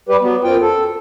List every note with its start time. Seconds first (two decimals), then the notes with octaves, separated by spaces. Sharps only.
0.09 G3 G4 B4
0.21 F#3 B3
0.44 F#2 C4 F4 G5
0.62 A4